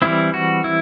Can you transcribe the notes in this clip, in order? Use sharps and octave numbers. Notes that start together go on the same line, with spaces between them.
E3 G3 C4 E4
F#4
E4